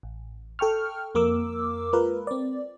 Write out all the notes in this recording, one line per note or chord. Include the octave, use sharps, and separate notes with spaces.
A1
A4 G5 C#6 F6
F2 A#3 A#4 D6 E6
G#3 F4 A#4 B4
C4 D5